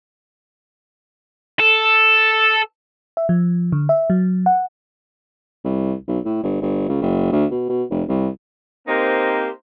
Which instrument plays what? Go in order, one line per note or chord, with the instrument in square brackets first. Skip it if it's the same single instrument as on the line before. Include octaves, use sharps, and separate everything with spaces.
[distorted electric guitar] A4
[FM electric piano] E5
F3
D3
E5
F#3
F#5
[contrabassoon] C2
B1
A2
G1
G1
C#2
F#1
D2
B2
B2
F1
C2
[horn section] A#3 C4 D#4 G4 A#4 C5